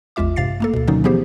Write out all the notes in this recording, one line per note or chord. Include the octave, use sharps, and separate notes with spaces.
A1 E2 G#3 F4 E5 D6
G2 C3 F5 A6 C7
A3 A#3 A4
D2 B2
B2 D3 D#3 F#3 C#4 D#4
E3 F3 B3 G4 G#4 C5